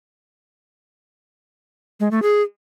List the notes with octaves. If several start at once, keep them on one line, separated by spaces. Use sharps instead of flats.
G#3
A3
G#4